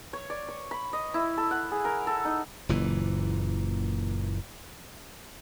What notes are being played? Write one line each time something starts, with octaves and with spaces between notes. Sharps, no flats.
C#5
D5
C#5
B5
D#5
E4
A4
F#5
G#4
A#4
A4
D#4
F#1 A#2 E3